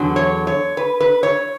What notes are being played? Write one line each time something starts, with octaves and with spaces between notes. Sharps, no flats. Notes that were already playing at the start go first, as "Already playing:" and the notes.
Already playing: E2 D3 F#3
C#5
C#5
B4
B4
C#5